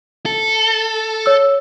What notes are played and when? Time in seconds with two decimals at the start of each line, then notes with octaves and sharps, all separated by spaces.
0.26 A4
1.26 C#5 E6